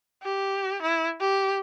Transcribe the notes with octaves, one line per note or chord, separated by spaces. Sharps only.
G4
E4
G4